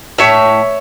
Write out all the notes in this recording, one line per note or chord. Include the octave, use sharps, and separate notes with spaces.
A2 C#5 E5